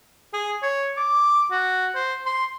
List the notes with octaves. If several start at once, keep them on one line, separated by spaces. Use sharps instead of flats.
G#4
C#5
D6
F#4
C5
C6